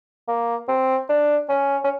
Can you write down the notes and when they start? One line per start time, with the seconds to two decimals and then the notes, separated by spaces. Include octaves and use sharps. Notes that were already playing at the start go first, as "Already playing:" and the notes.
0.28 A#3
0.68 C4
1.09 D4
1.49 C#4
1.84 C#4